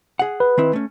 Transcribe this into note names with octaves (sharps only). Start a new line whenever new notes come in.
G#4 F#5
B4
D#3 C4 E4
A3 C#4